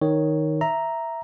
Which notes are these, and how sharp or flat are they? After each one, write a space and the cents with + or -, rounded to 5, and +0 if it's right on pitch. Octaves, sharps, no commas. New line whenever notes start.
D#3 +0 C#5 +0
E5 +0 A#5 +0